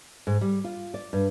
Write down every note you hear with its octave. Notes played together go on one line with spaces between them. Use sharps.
G#2
G3
F4
D5
G2